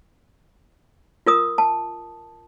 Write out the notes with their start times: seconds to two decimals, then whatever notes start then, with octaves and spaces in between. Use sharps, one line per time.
1.26 F4 A#4 D#6
1.58 A5